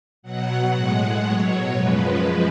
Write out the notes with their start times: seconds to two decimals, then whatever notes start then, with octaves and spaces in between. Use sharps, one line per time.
0.23 B2 F#3 F#5
0.73 A2 G#3
1.23 B2 F#3 C#5
1.74 F#2 F3 G#3 B4